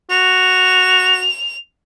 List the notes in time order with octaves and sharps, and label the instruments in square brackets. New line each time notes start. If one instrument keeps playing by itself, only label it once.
[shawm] F#4 [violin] F7